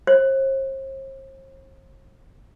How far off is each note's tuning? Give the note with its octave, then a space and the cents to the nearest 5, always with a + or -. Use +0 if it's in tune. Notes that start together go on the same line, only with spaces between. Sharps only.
C5 +45